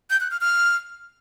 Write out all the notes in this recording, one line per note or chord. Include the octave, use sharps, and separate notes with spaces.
G6
F#6
F6
F6